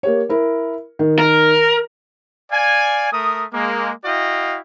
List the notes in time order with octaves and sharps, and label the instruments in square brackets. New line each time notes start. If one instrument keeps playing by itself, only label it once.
[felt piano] A#3 G4 C#5
E4 A#4
D#3
[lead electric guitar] A#4
[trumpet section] D5 F5 G#5
A3 A#4 D#6
G#3 A#3
E4 F#4 D#5 F5 G5